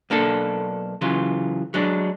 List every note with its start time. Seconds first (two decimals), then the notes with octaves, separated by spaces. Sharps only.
0.10 B1 A#3 D4 A4
1.01 C#3 E3 F#3 F4
1.74 F#3 G#3 D4